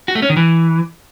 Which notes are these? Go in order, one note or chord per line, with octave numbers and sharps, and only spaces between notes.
F#4
A3
C#4
D#3
E3